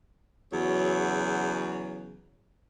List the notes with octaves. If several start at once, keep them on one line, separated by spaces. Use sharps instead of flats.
E2 C#3 F#3